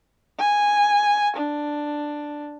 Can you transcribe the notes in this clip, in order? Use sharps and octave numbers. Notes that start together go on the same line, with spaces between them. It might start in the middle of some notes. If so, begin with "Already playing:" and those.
G#5
D4